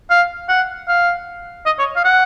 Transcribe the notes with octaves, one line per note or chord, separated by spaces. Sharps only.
F5
F#5
F5
D#5
C#5
F5
F#5